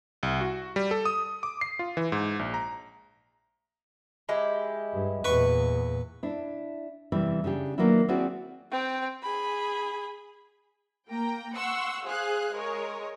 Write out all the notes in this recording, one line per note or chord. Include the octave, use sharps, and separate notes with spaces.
C2
F#4
G3
A4
D#6
D6
C7
F4
E3
G#2
A#1
A#5
G#3 E4 G4
G2
E2 A#2 B4 C#6
D4 E4
E2 C3 E3 G3 E4
C#3 C#4 D4 G4
D#3 F#3 A#3 B3 D4 E4
C4 C#4 E4 F#4 G#4 D5
C4 G5
G#4 B5
A#3 G5 A#5
F#5 C6 C#6 E6
G#4 C5 F5 F#6
G#3 G#4 A#4 C#5